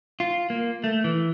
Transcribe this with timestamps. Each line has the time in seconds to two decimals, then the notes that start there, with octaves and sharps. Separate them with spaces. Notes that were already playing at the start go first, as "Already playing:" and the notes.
0.20 F4
0.50 A#3
0.84 A3
1.04 E3